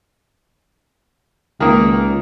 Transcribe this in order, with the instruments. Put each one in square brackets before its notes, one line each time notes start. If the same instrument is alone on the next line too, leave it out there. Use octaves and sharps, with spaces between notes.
[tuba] C#2 [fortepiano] D#3 A#3